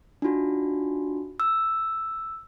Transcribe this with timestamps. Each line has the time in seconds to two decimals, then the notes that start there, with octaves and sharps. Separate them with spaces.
0.22 D4 D#4 F4 F#4
1.40 E6